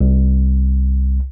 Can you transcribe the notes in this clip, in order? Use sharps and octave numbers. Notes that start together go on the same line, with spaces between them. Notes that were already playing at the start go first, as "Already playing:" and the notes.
C2